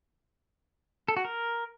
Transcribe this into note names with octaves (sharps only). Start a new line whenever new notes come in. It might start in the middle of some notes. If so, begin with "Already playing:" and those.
A4
F#4
A#4